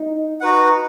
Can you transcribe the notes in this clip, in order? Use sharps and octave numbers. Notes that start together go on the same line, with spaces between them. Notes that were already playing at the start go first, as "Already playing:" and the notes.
Already playing: D#4
D#4 F#4 B4 F#5